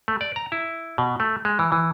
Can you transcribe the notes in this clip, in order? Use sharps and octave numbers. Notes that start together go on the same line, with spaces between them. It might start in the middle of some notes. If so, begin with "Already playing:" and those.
A3
D5
A#5
E4
B2
A3
G#3
E3
E3